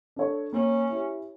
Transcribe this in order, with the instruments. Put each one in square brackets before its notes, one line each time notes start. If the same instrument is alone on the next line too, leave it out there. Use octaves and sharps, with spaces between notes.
[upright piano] D4 A4 C#5
[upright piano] A#3 [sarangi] C#4
[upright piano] E4 G4